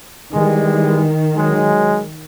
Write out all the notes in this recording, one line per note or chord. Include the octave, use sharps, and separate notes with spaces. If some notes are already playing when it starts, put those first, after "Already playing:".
D#3 E3 G3 G#3
F#3 G#3